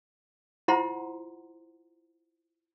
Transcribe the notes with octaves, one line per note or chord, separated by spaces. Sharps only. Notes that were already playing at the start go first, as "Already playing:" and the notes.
E4 F4 C5 F#5 A#5 C6